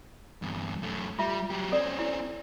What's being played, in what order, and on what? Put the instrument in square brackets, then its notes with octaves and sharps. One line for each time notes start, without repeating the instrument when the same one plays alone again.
[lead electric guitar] E2 G2
F#2 A3
[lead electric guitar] G3 [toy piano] F4 E5 A#5
[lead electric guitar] F#3 G4
[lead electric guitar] C4 C#4 [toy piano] A4 D5
[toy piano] E4